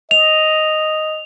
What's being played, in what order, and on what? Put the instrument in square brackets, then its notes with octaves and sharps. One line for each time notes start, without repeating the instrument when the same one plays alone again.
[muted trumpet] D#5 [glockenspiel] F7